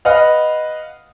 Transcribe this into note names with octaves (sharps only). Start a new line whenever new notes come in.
B4 D#5 F5 F#5 F6